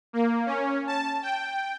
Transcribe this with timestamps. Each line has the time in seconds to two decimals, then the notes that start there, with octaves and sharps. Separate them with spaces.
0.13 A#3
0.46 C#4
0.87 A5
1.22 G5